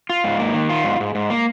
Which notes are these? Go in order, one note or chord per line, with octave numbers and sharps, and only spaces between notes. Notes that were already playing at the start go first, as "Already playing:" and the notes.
F4
G#2
A#3
D#3
F4
G#2
G#2
G#2
A#3